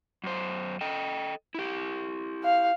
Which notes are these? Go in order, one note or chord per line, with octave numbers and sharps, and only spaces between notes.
F#2 C5
A4 D#5 G5
E4 G4
F5